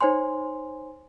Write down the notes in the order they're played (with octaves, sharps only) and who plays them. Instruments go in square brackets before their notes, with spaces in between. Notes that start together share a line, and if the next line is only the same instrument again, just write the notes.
[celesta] D#4 C5 C#5 G#5 C6